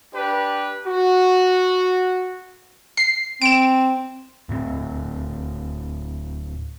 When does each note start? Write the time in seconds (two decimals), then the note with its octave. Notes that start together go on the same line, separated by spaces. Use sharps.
0.13 D4 G4 B4
0.86 F#4
2.97 C7
3.42 C4 D7 E7
4.49 D1 A2 A3 C4